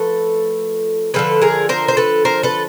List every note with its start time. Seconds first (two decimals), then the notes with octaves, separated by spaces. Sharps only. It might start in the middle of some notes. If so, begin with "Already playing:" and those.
Already playing: F3 A3 A4 B4
1.14 D3 F3 G#3 A4 B4
1.42 G#4 A#4
1.69 A#4 C5
1.88 C5
1.97 A4 B4
2.25 A#4 C5
2.43 A4 B4